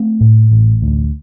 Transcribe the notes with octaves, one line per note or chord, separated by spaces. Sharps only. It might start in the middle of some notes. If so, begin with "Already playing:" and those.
Already playing: A3 C4
A2
A1
D2